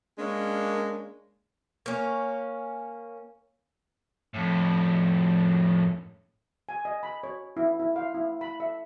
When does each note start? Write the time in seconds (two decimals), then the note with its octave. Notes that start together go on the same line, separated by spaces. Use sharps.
0.19 G#3 A#3 C#4 D4
1.86 A#3 C#4
4.34 F2 A2
6.69 G#5
6.85 D#5
7.03 B5
7.23 C#5
7.57 E4
7.80 E4
7.96 F5
8.15 E4
8.41 B5
8.60 E5